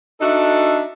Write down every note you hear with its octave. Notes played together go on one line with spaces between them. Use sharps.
D4 D#4 F#4 A4 E5